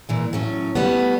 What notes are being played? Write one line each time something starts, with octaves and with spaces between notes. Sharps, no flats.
A#2 E3 G#3
A2 F#3 C#4
G3 A3 B3